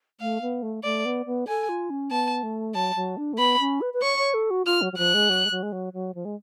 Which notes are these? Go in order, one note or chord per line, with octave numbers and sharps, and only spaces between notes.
A3 F5
B3
A3
A3 D5
B3
B3
A4 G#5
F4
C#4
B3 A5
A3
F#3 A5
F#3
D4
A3
B3 B5
C#4
B4
B4
C#5 C#6
C#5
A4
F#4
F4 F6
F#3
F#3
F3 F#6
G#3
F#3
G#3
F#3
G#3
F#3
F#3
F3
G#3